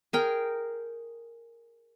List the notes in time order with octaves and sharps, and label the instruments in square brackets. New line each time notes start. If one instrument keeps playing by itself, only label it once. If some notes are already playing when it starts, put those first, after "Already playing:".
[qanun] G#4 A#4 G5